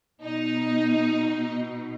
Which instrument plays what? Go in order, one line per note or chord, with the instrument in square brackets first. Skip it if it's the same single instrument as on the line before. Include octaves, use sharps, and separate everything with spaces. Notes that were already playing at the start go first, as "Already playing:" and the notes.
[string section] B2 D#4